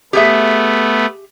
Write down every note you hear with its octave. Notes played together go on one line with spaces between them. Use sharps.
A3 B3 G4 G#4 E5